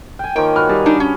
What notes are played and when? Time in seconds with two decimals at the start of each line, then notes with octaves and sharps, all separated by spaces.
0.19 G5 G#5
0.36 D#3 F3 A#3 C#5 G5
0.56 F#4 B4 F6
0.69 G3 G#4
0.86 D4 D#4
1.00 C#4